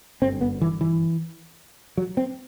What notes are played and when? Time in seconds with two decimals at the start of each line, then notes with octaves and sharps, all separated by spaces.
0.22 G1 F#2 D3 C4
0.41 B3
0.62 E3
0.81 E3
1.97 F#3
2.17 C4